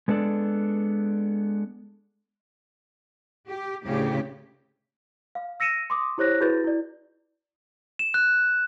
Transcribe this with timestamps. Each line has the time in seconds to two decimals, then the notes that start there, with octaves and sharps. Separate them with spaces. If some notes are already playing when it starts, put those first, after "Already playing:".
0.08 G#3 B3 D4 A4 D5
3.48 G4
3.85 D2 A2 C#3 G4
5.35 F5
5.60 E6 A#6 C#7 D#7 E7
5.90 C6 D6 D#6
6.18 E4 G4 C5 C#5 F#6 A#6
6.40 E4 F#4 G#4 B4 G6 A6
6.64 E4 D5
7.99 E7
8.14 F#6